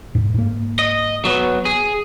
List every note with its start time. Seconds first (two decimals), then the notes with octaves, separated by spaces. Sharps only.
0.15 G#2
0.34 G#2 A#3
0.79 D#5
1.25 F#3 B3
1.65 G#4